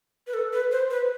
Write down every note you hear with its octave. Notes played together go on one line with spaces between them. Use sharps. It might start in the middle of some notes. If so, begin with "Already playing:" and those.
B4
A4
B4
C5
B4